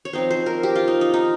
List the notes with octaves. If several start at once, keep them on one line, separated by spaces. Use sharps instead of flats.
C#5
F3 C4 D#4 C5
C5
A#4
G4
F4
D#4
D#4
D#4